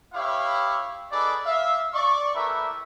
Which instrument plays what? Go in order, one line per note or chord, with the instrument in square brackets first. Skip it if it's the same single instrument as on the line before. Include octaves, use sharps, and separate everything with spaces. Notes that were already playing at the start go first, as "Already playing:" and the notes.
[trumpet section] E4 G4 B4 C#5 E5 F5
D#4 G#4 A4 B4 D5
E5 F5
D5 C#6
A3 E4 G4 A#4 B4 E5